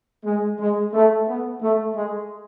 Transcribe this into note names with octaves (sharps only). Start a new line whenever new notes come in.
G#3
G#3
A3
B3
A3
G#3